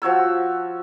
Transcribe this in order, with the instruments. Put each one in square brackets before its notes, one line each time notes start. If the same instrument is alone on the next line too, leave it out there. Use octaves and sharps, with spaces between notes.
[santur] F3 F#4 C#5 E6